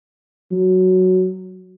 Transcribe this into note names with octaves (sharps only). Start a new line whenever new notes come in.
F#3